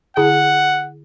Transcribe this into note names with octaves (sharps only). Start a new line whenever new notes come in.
D3 E4 G#4 F#5